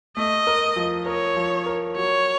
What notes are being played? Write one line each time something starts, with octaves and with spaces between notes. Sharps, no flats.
A3 D#5
A#4
F3
A#4 C#5
F3
A#4
F#3 C#5